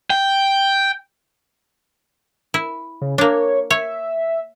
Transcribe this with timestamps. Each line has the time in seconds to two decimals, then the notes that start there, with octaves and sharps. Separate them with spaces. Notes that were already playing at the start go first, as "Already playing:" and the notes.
0.10 G5
2.54 E4
3.01 C#3
3.18 A#3 D4 C#5
3.70 C#5 E5